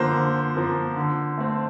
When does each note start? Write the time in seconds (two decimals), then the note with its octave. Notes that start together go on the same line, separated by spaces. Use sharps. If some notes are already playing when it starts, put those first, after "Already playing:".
Already playing: D3 F3 A#3 C5
0.13 D3
0.55 F3 A#3
0.97 D3
1.38 A3 C4